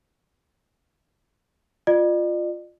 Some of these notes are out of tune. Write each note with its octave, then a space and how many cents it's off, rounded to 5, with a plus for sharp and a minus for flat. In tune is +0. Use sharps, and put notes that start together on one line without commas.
F4 +5 D5 +45